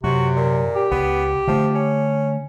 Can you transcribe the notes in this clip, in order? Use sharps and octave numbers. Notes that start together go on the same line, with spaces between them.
F#2 C3 F#4
A#2
G4
C#2 B3
D3 F3 A3
C#4